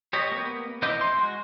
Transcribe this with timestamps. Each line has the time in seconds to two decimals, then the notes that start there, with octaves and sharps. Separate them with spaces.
0.13 G4 C#5 D#5
0.32 A#3 B3
0.82 E3 D#4 D#5 D6 G6
1.01 C6
1.17 G#3 F#4